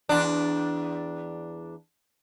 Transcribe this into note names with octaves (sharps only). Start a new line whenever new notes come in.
E2 D4